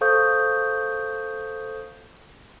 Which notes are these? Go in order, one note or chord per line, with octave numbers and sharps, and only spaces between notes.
A4 C5 F5 C#6 D#6 G6